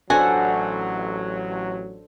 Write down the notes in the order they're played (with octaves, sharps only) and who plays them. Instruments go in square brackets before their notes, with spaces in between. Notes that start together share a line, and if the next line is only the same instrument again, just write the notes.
[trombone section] A1 F#3 [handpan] D4 A4 C5 [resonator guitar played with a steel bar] F#4 F#5 [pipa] G#5